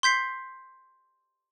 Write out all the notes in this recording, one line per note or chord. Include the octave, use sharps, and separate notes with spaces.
C6 G6 B6 C7